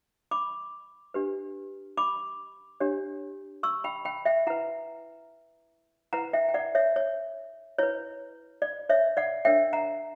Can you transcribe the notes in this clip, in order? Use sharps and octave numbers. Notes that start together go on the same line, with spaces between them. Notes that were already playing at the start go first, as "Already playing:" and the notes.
B5 D6
D4 G4 B4
B5 D6
D4 G4 C#5
C#6 E6
G5 B5
G5 B5
E5 G5
E4 B4 F#5 A#5
E4 B4 F#5 A#5
E5 G5
G5
D5 F#5
C#5 E5
C#5
E4 B4 C#5
D5
C#5 E5
D5 F#5
D4 A#4 C#5 E5 G5
F#5 A#5